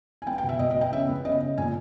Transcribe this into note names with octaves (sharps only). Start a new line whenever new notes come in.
G#5
B3 G5
G5
B2
E5
B2 D#5
D#5
B3 G5
C#3 E5
B3
C#3 D#5
C#3
A#2 G#5